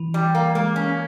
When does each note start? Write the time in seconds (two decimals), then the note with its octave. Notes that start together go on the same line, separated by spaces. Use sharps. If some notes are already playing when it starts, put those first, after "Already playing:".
Already playing: E3
0.14 G3
0.35 A#3
0.55 G#3 A#3
0.76 C#4